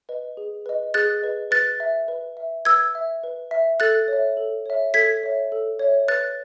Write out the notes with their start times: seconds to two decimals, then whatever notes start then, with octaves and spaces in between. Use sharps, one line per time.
0.09 B4 D#5
0.37 G#4
0.66 B4 D#5
0.94 G#4 F#6 A6
1.22 B4 D#5
1.51 B4 F#6 A6
1.80 E5
2.08 B4
2.37 E5
2.65 B4 E6 G#6
2.95 E5
3.24 B4
3.51 E5
3.80 A4 F#6 A6
4.08 C#5 E5
4.37 A4
4.66 C#5 E5
4.94 A4 G#6 B6
5.23 C#5 E5
5.52 A4
5.79 C#5 E5
6.08 B4 F#6 A6